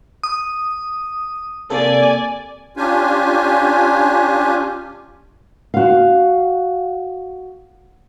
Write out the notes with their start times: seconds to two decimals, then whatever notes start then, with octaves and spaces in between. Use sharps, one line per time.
0.23 D#6
1.70 C3 A#3 A4 D5 G#5
2.77 C#4 D4 F4 G4 G#5
5.74 F#4 F5